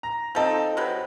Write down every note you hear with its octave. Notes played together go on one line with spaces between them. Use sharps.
A#5
F3 C4 D#4 A4 A#5
C3 F#3 B4